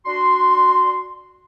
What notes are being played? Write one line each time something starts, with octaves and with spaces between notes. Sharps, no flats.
D4 F#4 C6